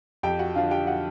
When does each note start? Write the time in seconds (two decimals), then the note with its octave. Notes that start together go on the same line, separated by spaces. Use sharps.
0.23 F2 G4 G5
0.39 F#4 F#5
0.55 D3 F3 F4 F5
0.71 G4 G5
0.87 F#4 F#5